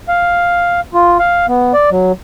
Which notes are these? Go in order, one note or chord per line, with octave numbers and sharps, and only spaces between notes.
F5
F4
F5
B3
D5
F#3